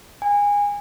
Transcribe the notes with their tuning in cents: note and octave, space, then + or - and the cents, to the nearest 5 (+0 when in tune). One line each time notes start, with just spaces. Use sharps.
G#5 -25